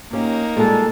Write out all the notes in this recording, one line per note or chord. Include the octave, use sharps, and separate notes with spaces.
A#3 C#4 D#4 G4
A#2 G3 G#3 A4